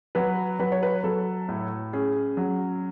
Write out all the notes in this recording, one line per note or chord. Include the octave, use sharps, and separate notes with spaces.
F#3 B4
F#3 B4
C#5
B4
F#3 A4
A2
C#4 G#4
F#3